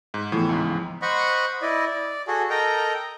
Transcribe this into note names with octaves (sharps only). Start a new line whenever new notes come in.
G#2
A2 E3 F3 B3
C#2 G#2
C5 D#5 F#5 B5 C#6
E4 D5 D#5
D5
F#4 G#4 A4
A4 A#4 D#5 G5 A#5